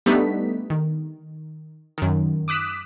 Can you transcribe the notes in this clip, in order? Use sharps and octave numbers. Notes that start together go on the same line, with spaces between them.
G3 A3 B3 D4 D#4 B6
D#3
F#2 D#3
D6 D#6 F#6 B6 E7